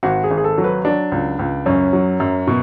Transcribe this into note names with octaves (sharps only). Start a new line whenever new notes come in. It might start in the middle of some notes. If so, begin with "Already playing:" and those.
G#1 F#4
G#4
G#1
G#4
A4
F#3
B4
F#3 D4
C#2
C#2
F#2 C#4
F#3
F#2
B2